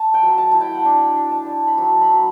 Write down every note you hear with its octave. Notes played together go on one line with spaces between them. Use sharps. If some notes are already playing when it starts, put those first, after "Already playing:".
Already playing: A5
G5
F#3 B5
A5
E4 A5
G5
F#5
D4 G5
D4
A5
D4
B5
F#3 A5
B5
F#3